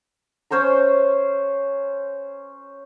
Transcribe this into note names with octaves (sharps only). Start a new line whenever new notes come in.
C#4 C5 C#5 A#5